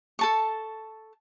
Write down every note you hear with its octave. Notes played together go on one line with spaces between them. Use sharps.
A4 A5 C#6